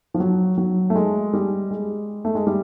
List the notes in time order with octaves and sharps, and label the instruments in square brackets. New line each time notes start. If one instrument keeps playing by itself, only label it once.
[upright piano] F3
F#3
F#3
A3
G#3
G3
G#3
A3
G#3
G3